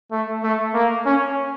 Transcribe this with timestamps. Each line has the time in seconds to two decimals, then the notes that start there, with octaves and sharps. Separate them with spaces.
0.12 A3
0.44 A3
0.74 A#3
1.06 C#4